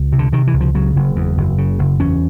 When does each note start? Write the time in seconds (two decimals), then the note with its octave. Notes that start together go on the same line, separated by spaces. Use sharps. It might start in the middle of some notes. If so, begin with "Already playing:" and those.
Already playing: C#2
0.12 C3
0.19 D3
0.33 C3 D#3
0.47 E3
0.54 C#2
0.61 F3
0.75 C#3 F#3
0.96 F#1
1.16 E2
1.37 F#1
1.58 C#3
1.79 F#1
1.99 E2 C#4